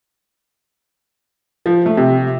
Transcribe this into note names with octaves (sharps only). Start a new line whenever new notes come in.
F3
A3
C3